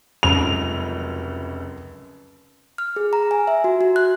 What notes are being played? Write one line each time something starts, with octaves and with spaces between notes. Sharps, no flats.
F1 C#2 F#2 F7
F6
G#4
A#5
G#5
E5
F#4
F#4
F#6